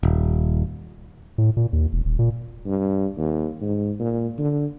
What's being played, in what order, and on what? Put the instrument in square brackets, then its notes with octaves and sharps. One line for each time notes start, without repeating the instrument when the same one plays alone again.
[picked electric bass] D#1
[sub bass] A2
A#2
D#2
E1
D#1
A#2
[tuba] G2
D#2
G#2
A#2
D3